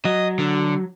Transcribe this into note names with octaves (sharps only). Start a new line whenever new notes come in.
F#3 D#5
D3